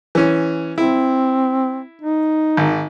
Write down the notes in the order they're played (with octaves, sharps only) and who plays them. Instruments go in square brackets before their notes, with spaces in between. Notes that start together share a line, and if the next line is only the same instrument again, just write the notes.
[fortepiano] E3 C#4
[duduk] C4 [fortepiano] E4
[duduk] D#4
[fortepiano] G#1